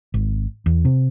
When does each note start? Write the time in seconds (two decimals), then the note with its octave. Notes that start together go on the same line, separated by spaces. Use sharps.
0.14 G#1
0.66 E2
0.85 C3